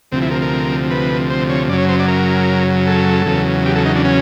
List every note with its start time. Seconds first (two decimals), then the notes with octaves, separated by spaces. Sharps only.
0.12 D2 C3 F3 C4
0.22 E4
0.31 A#4
0.42 A#4
0.91 B4
1.30 C5
1.50 C#5
1.68 F#2 C#3 F#3 D5
1.78 C#5
1.89 C5
1.99 D5
2.08 A#4
2.87 A4
3.26 E2 C#3 F#3
3.66 G4
3.76 A4
3.85 D#4
3.95 D4
4.05 C#4